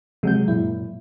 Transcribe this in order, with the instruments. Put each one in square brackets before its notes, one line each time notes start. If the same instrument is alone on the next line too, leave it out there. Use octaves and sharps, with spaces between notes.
[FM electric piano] C3 G#3 [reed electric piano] F3 F#3 G6
[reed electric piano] F#2 A#2 [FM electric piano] E4